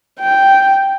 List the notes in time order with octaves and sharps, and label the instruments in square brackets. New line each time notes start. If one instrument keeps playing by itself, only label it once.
[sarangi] G5